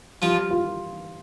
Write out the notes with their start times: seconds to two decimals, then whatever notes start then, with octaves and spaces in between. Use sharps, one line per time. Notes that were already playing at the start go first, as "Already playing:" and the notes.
0.22 F3 G3 F4
0.50 F4